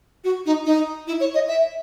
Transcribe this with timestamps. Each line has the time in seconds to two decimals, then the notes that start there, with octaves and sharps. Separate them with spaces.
0.24 F#4
0.46 D#4
0.66 D#4
1.08 E4
1.20 C#5
1.34 D#5
1.48 E5